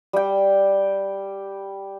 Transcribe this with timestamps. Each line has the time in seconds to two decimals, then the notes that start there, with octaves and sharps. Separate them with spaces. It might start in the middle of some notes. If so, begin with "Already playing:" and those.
0.13 G3 G5